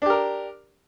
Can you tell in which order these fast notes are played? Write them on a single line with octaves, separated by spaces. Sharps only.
D4 G4 A#4